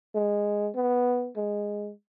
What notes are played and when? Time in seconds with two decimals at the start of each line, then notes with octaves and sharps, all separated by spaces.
0.15 G#3
0.75 B3
1.37 G#3